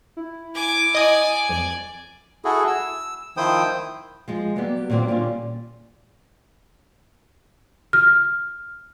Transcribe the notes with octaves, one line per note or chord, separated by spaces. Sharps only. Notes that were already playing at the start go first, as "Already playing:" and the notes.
E4
G#5 D6
D5 D#5 G#5 D6 D#6
F2 D5
E4 F#4 G#4 A4
E6
D#3 F3 E4 C5 G5 D#6
F3 G#3
F#3 G3 A#3 B3 G4
A#2 D#3 F#3 A#3 C4
A#2 D3 D#3 G3 C#4 F4
F6